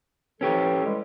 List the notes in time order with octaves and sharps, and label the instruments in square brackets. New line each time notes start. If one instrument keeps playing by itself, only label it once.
[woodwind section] E3 F3 A4 [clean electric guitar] C#4 G4 C#5
[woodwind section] E3 G3 G#3